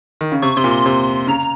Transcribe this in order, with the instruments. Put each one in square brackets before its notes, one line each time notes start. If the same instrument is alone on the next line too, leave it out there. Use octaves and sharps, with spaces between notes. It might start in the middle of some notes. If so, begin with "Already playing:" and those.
[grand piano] D#3
C#3
[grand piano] C3 [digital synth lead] C#6
[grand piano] C3 [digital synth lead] C6
[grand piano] A#2
[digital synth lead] C6
[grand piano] C3
[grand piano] C#3 [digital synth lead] A#5